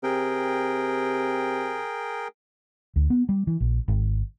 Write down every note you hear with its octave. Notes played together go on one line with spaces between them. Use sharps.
C3 G#4 A#4 G5
D2
B3
G3
E3
A#1
G#1